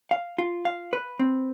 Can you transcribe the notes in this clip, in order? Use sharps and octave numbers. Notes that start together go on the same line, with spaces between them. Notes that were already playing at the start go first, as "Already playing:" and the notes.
F5
F4
F5
B4
C4